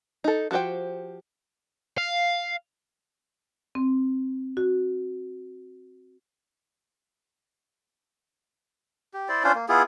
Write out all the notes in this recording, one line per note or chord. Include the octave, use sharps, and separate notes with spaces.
D#4 A4
F3 F#4 G4 C5 G5
F5
C4
F#4
G4
E4 C5 D5
C#4 D4 F4 C5
A#3
B3 E4 F4 G#4